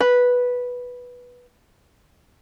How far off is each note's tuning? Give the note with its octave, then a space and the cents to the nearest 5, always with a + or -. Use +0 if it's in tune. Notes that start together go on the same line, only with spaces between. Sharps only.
B4 -5